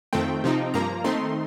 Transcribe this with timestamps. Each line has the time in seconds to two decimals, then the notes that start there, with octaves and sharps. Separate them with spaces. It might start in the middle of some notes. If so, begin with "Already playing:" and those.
0.13 F2 D#3 A3 C4 G5
0.44 C3 F3 C4 D#4
0.74 G2 F3 A#3 A#5
1.04 D#3 A3 C4 D#4 C6